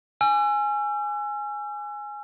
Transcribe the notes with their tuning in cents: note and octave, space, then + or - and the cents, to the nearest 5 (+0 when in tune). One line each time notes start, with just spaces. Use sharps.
G#5 +0 E6 +40